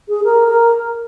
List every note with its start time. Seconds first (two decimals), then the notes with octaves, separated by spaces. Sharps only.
0.08 G#4
0.24 A#4
0.47 A#4